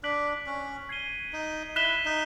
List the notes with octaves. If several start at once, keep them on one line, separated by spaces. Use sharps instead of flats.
D4 F#6 B6 D7 F#7
C#4
G#6 C7 D#7 G7
D#4
E4 F#6 B6 E7 G7
D#4